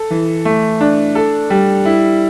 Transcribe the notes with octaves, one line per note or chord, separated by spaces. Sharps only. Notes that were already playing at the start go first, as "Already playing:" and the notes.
Already playing: A4
E3
A3
D4
A4
G3
E4